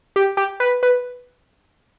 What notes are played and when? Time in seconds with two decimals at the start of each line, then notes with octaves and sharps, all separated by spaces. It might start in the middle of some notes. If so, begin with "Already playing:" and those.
0.16 G4
0.37 G4
0.60 B4
0.83 B4